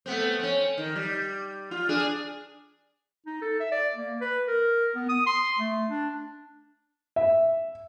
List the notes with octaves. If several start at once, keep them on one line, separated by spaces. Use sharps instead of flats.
A3 B3 C4
C4 C#4
D#3
G3
F4
D4 G#4
D#4
A4
E5
D5
A#3
B4
A#4
B3
D#6
C6
A3
D4
E5